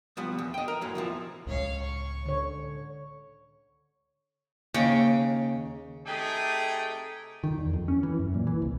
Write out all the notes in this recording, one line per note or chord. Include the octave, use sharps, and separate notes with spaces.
F3 G3 B3
E2
D#5 G5
A#4
F#2 A2 A#3
E2 E3 F3
C#2 A2 G#3 C#5 F5
C#6
D3 C#5
D#2 C#3 G5
C3 A3 D#4 G4 G#4 G5
D#3
E2
F2
C#4
E3
F#2
A#2
E3
C2